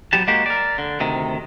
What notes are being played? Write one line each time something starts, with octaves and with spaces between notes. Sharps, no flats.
F#3 B3 G4 A5
G#3 A#3 F#4 G4
A#4 D5
D3
D2 C3 D#3